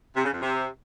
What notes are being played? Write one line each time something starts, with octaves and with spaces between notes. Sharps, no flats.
C3
C#3
F2
C3